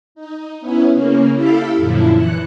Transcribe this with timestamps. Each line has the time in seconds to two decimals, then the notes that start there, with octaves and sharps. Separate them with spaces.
0.15 D#4
0.61 B3 C#4 E4
0.93 C#3 A#3 C#4
1.34 E4 G4 A4 E5 F5 B5
1.76 F#2 A#2 D3 F3 E4
2.12 E3 F#6 C#7